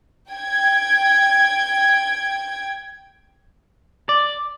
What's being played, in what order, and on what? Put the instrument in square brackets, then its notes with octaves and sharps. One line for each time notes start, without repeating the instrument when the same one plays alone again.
[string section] G5 G#6
[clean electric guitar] D5